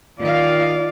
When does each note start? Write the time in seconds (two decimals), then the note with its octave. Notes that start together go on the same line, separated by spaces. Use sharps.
0.21 D#3 F4 D5 F5